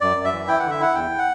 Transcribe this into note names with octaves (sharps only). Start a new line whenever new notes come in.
F#2 D5
F#2
E5
E3
E4 G5
D3 F#5
E5
E4 F#5
E2 G5
F#5